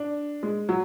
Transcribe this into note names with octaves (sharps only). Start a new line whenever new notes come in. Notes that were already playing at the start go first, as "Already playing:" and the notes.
Already playing: D4
G#3
F#3